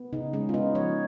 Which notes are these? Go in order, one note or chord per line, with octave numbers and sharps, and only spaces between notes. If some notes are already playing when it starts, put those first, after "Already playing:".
Already playing: B3
C#3 D#4
G#3 C#4
F4
B3 D#4
F3 C#5